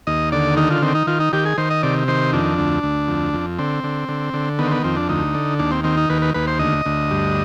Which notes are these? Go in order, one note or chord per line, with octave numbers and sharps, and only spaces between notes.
D#2 D#5
D3 D5
D#3 D#4
F4
D#3 C4
D#4
D#3 F4
D#4
D#3 G4
G#4
D#3 C5
D#5
C3 D5
D#3 C5
F2 D4
D2
D2
F2
F2
D3 C4
D3
D3
D3
D#3 B3
C4
B3
F2 C4
D4
D2 D#4
D3
D#2 D4
C4
D#3 C4
D#4
D#2 B4
B4
D#2 B4
C5
D2 D#5
D2
G2